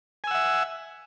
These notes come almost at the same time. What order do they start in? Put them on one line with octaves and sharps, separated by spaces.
G#5 E6 F#5 E5